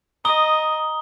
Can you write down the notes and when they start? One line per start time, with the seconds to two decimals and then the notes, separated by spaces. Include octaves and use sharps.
0.25 D#5 A#5 D#6 G7